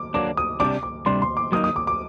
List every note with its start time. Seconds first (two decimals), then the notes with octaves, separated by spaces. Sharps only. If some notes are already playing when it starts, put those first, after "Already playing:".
Already playing: D6
0.14 F#3 A#3 D4 D6
0.37 D#6
0.60 C3 G3 D4 D6
0.83 D6
1.06 C3 G3 D4 C6
1.22 C6
1.37 D6
1.52 F#3 A#3 D#4 D#6
1.64 D#6
1.76 D6
1.87 D6